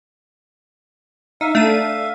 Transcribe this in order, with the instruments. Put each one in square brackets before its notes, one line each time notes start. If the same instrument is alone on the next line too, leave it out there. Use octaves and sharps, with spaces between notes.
[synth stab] D#4 [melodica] E5 F5
[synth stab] A3 D4 D#7